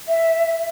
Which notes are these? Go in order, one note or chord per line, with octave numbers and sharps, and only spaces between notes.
E5